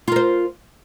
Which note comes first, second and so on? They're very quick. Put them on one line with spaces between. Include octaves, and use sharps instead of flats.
F4 A#4 C5